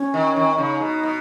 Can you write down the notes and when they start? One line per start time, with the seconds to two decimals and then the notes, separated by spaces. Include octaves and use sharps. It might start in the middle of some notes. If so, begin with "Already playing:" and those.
Already playing: C#4
0.14 D#3
0.36 D#3
0.58 C#3 D#4
0.81 B2
1.03 B2